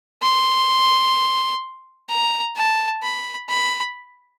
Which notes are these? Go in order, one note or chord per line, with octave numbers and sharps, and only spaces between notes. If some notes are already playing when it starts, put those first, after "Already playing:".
C6
A#5
A5
B5
B5